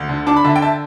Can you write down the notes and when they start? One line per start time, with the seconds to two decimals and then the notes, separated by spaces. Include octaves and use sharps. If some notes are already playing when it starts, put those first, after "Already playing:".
Already playing: D2
0.09 D3
0.27 D4 A5 D6
0.36 B5
0.44 D3 E5 A5
0.56 G5
0.62 E5 A5